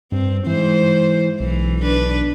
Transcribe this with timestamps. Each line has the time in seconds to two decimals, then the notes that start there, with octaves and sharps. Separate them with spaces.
0.12 G2 C4
0.47 G#2 E3 C5
1.40 B1 E3
1.82 D4 B4